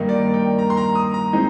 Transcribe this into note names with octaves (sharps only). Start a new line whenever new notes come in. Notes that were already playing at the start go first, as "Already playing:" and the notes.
Already playing: G2 D#3 A#3 D#4
D5
G5
A#5
C6
A#5
D#6
A#5
G#3 C4 D#4